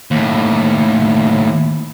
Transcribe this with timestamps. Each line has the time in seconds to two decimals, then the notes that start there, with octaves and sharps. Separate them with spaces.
0.11 D#2 A2